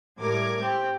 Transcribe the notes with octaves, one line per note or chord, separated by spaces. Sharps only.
A2 G3 A#4 D6 G#6
C4 G4